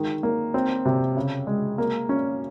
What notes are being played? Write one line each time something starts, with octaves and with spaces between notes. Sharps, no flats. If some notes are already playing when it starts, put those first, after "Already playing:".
Already playing: D#3 G#3
A#3
C4
C3
C#3
G#3
A#3
C#4